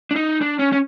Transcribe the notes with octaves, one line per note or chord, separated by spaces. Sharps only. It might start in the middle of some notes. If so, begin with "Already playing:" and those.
D4
D#4
D4
C#4
C#4